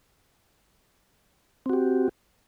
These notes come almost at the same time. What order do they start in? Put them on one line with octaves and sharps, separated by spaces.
C4 F#4 G4